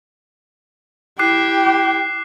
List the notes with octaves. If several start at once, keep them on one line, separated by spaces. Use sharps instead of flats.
E4 G4 D6 F#6 C7